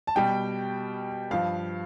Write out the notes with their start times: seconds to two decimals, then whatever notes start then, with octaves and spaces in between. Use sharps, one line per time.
0.07 A5
0.15 B2 G3 G5
1.31 G2 F3 F5